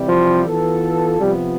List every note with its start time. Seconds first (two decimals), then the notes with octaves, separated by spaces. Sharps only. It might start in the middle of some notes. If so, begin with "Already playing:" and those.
Already playing: C3 E3 G3
0.08 F3
0.45 E3 B3 F4 A4
1.19 C3 F3 G3 B3